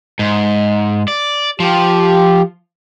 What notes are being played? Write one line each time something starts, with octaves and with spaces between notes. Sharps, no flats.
G#2
D5
F3 G4